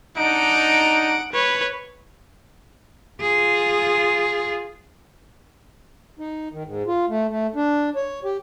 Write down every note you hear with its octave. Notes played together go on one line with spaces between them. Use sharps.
D4 D#4 F#5 D7
B4 C#5
F4 G#4
D#4
D#3
G#2
F4
A3
A3
D4
C#5
G4